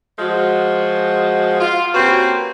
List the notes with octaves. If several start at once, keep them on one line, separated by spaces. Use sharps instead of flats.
F3 G#3 F#4
F4
A#3 C4 C#4 F#4 G4 B4